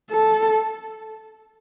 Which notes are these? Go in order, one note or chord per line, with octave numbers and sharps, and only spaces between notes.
A4